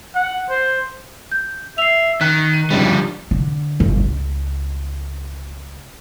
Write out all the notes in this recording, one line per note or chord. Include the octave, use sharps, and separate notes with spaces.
F#5
C5
G6
E5 C7 F7
D#3 F#6 B6
D#7
G1 C#2 G#2 F3 G3
D2
D3
G1
C#2